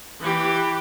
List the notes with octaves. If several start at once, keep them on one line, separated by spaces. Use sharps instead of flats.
E3 G4